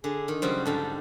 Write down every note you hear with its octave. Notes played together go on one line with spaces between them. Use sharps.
D3 G#4
D#3
C#3 F#3 G3 C5
G#2 D3 G3 A4